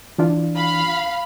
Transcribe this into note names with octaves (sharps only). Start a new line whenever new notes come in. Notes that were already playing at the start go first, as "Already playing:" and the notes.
E3 D4 F4
F5 B5